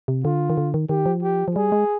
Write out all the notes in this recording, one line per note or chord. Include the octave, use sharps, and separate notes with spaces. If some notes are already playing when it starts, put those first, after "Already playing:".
C3
D3 F4
D#3
D3
D#3
D#3 G4
F3
G4
F3
G3 G#4
G#3